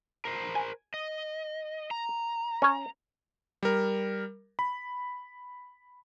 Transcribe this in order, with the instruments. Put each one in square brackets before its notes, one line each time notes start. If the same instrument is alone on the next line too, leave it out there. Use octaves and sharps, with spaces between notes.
[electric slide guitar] A#4 C5
[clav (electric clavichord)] G#5
[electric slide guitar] D#5
A#5
[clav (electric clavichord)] C#4 C#5
[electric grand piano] G3 A#4
B5